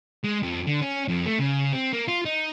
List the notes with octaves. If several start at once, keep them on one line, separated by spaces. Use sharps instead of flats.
G#3
F2
D3
C#4
F2
A3
C#3
C4
A#3
F4
D#4